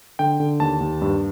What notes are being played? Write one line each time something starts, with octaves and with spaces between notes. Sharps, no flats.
D3 G5
D3
D#2 A5
D#2
G2